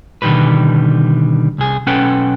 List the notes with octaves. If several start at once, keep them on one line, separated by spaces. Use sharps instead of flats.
B2 D3 D#3 F#3 G3 B4
C2 G#4
B1 C#4 A4 B4 F#5 G5